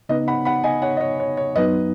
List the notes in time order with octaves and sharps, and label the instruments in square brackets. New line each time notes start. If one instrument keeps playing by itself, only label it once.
[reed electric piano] C#3 B3 D#4 [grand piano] B4 D#5
[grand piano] F#5 B5
F#5 B5
D#5 G#5
C#5 F#5
D#5
C#5
C#5
C#5
[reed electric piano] F#2 F#3 B3 D#4 [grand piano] B4 D#5